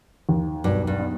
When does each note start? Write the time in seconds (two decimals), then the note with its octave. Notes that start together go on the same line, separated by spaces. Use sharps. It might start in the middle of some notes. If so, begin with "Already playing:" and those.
0.29 D#2
0.64 B1 G2
0.87 G2
0.99 B3